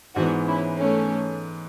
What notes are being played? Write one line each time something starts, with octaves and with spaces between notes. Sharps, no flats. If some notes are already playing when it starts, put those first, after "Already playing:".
G#2 E3 B3 D4 F#4
C#4 E4
A3 C#4